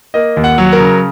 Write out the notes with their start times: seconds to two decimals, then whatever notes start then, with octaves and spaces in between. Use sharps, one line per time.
0.14 A#3 D#5
0.37 D#2
0.44 F#5
0.58 F#3
0.72 A#4
0.80 C#3